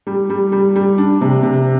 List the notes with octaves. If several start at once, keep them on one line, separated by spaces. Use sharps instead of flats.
G3
G3
G3
G3
D4
C3
C3